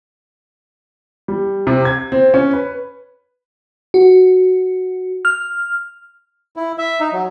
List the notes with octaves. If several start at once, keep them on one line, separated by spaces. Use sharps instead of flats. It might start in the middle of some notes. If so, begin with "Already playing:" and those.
G3
C3
G#6
C4
C#4
B4
F#4
F6
E4
E5
D#4
F#3